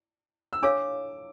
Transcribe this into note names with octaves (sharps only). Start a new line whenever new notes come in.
E6
D4 A4 C#5 F5 D6